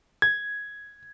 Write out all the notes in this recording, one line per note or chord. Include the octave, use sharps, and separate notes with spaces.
G#6